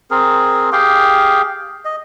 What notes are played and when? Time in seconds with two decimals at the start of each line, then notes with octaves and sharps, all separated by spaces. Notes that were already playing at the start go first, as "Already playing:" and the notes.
0.11 C4 G#4 A#4
0.72 G4 G#4 F5 G5
1.85 D#5